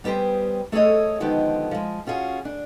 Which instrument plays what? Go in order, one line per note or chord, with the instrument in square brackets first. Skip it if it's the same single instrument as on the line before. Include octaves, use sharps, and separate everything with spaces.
[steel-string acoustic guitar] G3 B3 G4 G#4 C5
A3 G#4 A4 C#5 D#5
D3 D#3 F3 G#3 B3 G4
F3 G#3
C#4 F4 F#4 G#4
D4